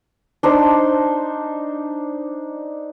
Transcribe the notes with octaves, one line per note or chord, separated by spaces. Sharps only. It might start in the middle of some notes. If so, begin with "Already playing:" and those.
D4 D#4 C5